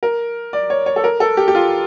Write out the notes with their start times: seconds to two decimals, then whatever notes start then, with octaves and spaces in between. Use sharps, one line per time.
0.03 A#4
0.53 D5
0.70 C#5
0.86 C#5
0.96 A4
1.04 A#4
1.20 A4
1.37 G4
1.48 G4
1.55 F4